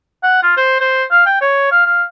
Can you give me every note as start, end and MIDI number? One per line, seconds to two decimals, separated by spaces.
0.23 0.42 78
0.43 0.56 65
0.57 0.78 72
0.80 1.04 72
1.11 1.22 77
1.26 1.38 79
1.41 1.67 73
1.71 1.85 77
1.86 2.03 77